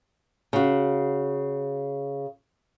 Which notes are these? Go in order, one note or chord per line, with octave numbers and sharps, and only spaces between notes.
C#3 F#4